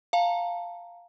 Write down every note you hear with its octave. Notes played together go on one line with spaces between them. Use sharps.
F5 A5 A#5